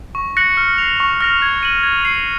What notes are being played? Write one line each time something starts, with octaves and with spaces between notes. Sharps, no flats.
C#6
F#6 A#6 C#7 F#7
F6
C7 F7
C#6
F6 A#6 C#7 F7
G#6
D#7 F#7
G#6
C7 F7